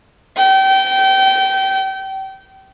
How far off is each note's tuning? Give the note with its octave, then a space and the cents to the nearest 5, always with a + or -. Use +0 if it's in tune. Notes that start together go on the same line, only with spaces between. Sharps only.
G5 -25